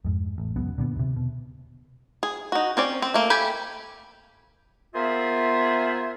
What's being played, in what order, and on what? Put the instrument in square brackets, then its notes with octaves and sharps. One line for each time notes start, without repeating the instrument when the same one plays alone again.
[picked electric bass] F2 G#2
A1
D1 C#2 F#2 B3
A#2 D3 B3
D#2 C3
B2
[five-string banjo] G#4
D#4 F#4
C4 C#4 D5
C4
A3 A#3
G4 A4 G5 G#5 B5
[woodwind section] A#3 B3 F4 G#4 C5 E5